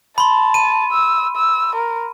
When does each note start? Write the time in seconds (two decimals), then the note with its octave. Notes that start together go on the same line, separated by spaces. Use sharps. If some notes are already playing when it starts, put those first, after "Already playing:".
0.18 A5 B5 C6
0.54 D#7
0.92 E6
1.36 E6
1.75 A#4